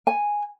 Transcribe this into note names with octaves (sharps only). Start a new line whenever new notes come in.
G#5